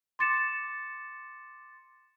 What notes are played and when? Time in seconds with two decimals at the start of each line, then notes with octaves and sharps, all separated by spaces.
0.19 C6 D6 A6 C#7 E7